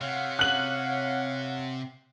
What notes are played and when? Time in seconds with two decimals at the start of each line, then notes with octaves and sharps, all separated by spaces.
0.01 C3 C#5 F5 F#5
0.39 F#6 F#7